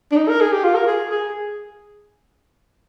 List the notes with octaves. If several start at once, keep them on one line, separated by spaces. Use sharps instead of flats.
D4
D#4
A#4
G#4
G4
F4
A#4
G#4
G#4